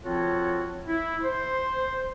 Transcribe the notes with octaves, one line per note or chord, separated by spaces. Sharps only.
F3 C4 F4 F#4 A4 C#5
E4
C5